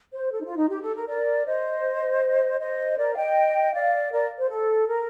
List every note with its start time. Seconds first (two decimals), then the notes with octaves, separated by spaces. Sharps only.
0.13 C5
0.31 A4
0.40 D#4
0.44 F4
0.57 D#4
0.69 G4
0.82 A4
0.95 A#4
1.07 A#4 D5
1.45 C5 D#5
2.60 C5 D#5
2.98 A#4 D5
3.13 F5
3.17 D#5 G5
3.74 D5 F5
4.12 A#4 D5
4.37 C5
4.50 A4
4.88 A#4